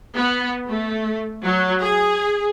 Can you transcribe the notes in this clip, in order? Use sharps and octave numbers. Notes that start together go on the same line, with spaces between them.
B3
A3
F#3
G#4